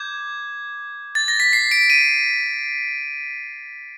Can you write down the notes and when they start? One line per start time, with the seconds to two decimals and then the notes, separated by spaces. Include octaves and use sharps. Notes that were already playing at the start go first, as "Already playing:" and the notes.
Already playing: D6 G6 G#6
1.15 A6
1.28 A#6
1.40 B6
1.53 C7
1.71 D7
1.90 D#7